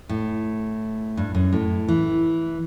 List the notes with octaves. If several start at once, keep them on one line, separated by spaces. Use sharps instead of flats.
A2
G2
F#2
A2
E3